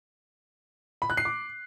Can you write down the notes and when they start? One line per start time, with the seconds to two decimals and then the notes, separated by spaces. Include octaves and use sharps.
1.02 B5
1.10 F#6
1.17 C7
1.25 D6